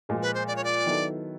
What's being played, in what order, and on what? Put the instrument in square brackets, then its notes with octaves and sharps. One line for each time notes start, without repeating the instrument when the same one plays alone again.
[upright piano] A#2 F3 G#3
[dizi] B4
C5
D5
C#5
D5
[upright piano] D#3 F#3 B3 E4 A4